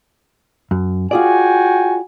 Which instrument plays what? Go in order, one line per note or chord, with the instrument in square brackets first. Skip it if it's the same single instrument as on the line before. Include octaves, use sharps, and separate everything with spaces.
[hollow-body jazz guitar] F#2
[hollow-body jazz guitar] F4 G#4 D5 [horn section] F#4 G5 G#5